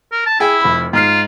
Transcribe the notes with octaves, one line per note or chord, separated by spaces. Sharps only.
A#4
A5
E4 G#4 G5
F1 B5
G#2 F4 F6 C7